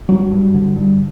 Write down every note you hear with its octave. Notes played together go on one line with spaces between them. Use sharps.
G2 F#3
G2
D3
G2